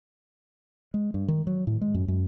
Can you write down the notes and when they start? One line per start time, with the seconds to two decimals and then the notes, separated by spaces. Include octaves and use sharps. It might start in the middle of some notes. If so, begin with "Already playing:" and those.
0.94 G#3
1.14 G2
1.28 D#3
1.47 F#3
1.67 A2
1.81 G#3
1.95 F#2
2.08 F#2